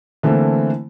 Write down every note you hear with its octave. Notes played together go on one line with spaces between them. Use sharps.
D3 E3 A3 A#3 C4